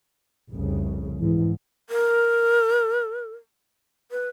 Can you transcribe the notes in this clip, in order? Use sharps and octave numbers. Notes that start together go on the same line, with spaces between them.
F1 C2 C#3
G#2 E3
A#4
B4